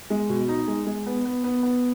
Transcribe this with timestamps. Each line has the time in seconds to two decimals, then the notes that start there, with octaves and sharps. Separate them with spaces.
0.10 G#3
0.29 B2
0.48 D#4
0.67 G#3
0.86 G#3
1.06 B3
1.25 B3
1.44 B3
1.63 B3